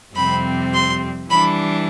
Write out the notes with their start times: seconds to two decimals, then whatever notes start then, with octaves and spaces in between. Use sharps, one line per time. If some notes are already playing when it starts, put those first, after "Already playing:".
0.15 F2 C3 G3 C4 B5
0.73 C6
1.29 E3 G3 D4 B5